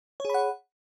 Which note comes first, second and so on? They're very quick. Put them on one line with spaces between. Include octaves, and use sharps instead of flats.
C#5 G#4 B5 F#5